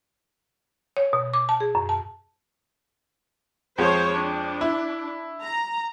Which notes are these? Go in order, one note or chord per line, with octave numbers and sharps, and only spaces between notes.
C#5
B2
D6
A5
G#4
F#2
A5
F2 F3 G#3 C5 C#5
D4
E4
A#5